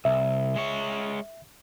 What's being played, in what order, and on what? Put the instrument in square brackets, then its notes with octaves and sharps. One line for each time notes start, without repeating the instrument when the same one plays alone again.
[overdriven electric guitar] C2 [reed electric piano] E5
[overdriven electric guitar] G#3 C#5